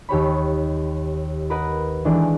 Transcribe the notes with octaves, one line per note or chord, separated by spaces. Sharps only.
D#2 G4 C#5 B5
A#4 B4 D#5 F#5
D#3 E3 G#3 D4 A4